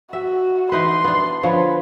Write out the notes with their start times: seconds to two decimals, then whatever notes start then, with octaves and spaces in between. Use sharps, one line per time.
0.13 F#4 E5
0.72 E3 D#4 B4 C6
1.04 B3 D4
1.43 D3 F3 B4 C#5